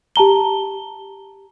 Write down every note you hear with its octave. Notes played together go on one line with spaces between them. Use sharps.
G4 A5 A#5 G7